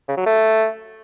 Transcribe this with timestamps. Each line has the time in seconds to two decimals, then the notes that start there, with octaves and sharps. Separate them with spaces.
0.08 C#3
0.17 F#3
0.26 A3